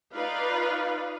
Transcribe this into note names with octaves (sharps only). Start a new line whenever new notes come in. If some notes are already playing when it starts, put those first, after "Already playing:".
D#4 F4 B4 D5 F5